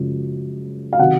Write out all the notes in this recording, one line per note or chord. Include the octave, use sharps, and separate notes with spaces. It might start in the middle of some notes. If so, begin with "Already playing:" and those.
Already playing: F#2 C#3 F3 G#3
F5
C3 D#3 F#3 F#5